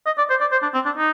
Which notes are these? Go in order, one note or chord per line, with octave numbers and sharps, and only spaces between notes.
D#5
D5
C5
D5
C5
D4
C4
D4
D#4